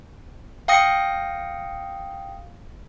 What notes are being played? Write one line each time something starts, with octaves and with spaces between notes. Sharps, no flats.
F5 G5 D#6 A#6 C#7